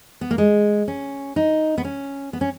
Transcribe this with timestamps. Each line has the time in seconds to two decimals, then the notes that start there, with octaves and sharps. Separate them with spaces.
0.21 B3
0.31 A#3
0.38 G#3
0.88 C#4
1.36 D#4
1.78 B3
1.85 C#4
2.33 B3
2.41 C#4